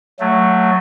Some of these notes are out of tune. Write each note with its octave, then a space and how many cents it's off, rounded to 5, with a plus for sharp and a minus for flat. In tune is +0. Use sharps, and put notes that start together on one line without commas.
F#3 +0 A3 +10